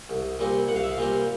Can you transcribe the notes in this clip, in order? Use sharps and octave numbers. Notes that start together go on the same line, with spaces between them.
C2
A#2 G3 C4
C2 F#5
F5
E5
F5
A#2 G3 C4